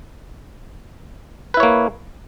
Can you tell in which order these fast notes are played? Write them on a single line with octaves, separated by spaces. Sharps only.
B4 E4 C#5 A#3